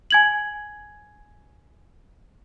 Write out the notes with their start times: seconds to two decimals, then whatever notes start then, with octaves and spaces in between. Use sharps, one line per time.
0.10 G#5 G#6 F#7